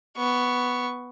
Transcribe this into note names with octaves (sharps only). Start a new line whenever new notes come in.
B3 C#6